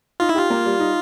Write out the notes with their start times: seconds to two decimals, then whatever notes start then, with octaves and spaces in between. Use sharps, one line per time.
0.20 D#4 F4
0.29 E4
0.35 F4 G4
0.50 A#3
0.65 G3
0.80 D#4